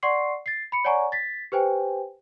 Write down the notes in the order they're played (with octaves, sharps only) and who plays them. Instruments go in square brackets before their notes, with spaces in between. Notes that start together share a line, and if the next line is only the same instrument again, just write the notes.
[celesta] D5 F#5 C6 C#6 C7
A6 C7
B5 C#7
C#5 D5 F#5 G#5 A#5 C#6
A6 B6
G4 B4 C5 G5 G#5